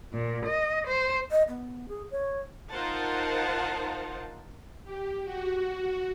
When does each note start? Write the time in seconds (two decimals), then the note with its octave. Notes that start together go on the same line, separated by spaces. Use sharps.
0.13 A#2
0.46 D#5
0.87 C5
1.31 D#5
1.48 B3
1.88 G#4
2.11 C#5
2.71 D#4 F4 A#4 C5 F#5 A5
4.84 G4
5.25 F#4